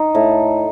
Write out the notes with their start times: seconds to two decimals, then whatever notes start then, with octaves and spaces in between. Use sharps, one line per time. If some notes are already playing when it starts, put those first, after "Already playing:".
Already playing: D#4
0.15 A2